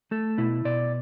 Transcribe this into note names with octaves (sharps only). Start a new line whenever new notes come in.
A3 A4
B2 E4
B2 D5